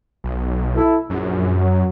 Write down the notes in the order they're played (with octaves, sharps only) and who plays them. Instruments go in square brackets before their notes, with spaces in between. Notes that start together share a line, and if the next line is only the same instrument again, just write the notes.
[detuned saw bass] B1
[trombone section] E4 A4
[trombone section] A#1 [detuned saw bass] F#2
[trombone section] F#3